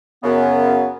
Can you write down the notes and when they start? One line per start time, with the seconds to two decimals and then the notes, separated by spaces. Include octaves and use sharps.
0.24 F#2 C#3 B3